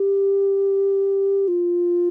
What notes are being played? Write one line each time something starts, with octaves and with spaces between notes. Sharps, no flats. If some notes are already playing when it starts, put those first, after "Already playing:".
Already playing: G4
F4